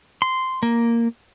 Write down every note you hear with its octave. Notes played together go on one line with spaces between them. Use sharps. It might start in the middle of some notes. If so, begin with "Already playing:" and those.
C6
A#3